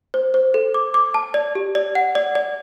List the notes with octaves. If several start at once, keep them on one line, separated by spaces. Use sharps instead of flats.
C5
C5
A4
D6
D6
A5
D5
G4
D5
F#5
D5
D5